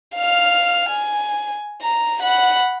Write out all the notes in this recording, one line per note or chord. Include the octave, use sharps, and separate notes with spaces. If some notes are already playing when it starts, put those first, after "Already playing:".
F5 F6
G#5
A#5
F#5 B5